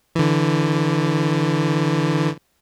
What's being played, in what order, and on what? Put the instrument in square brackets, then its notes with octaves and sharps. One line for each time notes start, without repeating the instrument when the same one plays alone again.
[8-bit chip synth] D3 E3